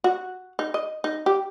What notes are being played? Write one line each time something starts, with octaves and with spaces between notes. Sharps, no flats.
F#4
D#4
D#5
D#4
G4